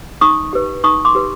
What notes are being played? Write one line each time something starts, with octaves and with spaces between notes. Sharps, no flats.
D#4 C#6 D#6
G4 B4
D#4 C#6 D#6
C6 D6
G4 B4